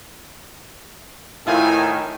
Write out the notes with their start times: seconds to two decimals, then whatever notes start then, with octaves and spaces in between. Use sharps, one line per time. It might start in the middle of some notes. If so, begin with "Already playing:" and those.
1.47 A2 D#3 C4 E4 F4 G#5